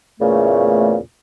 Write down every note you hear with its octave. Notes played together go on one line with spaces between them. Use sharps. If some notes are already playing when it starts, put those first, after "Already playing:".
E2 A#2 C#3 A3